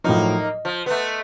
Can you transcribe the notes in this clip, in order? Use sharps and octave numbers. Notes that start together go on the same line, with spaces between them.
A2 F3 F#3 A#3 D#4
D#5
F3
A3 B3